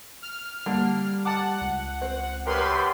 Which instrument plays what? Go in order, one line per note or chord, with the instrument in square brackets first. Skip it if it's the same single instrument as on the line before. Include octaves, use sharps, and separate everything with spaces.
[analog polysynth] F6
[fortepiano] D3 A#3 [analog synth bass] G3
[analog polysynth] F#5 [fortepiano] A5 D6
[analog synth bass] C#2
[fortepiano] C4
[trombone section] F#2 C3 G4 [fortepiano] A#4 [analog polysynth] B4 B5 C6